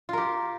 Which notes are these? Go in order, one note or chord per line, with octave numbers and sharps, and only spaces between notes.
F4 G4 A#4